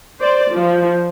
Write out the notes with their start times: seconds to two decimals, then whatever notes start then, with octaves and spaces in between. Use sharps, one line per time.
0.20 C5 D5
0.52 F3